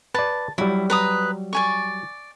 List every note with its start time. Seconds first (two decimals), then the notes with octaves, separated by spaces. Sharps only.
0.14 B4 D5 A5
0.58 F#3 G3 E4
0.90 B4 A#5 D#6
1.53 D5 G#5 C#6